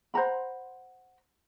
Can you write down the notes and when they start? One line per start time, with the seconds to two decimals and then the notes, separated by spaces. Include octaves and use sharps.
0.14 C5 F#5 A#5 B5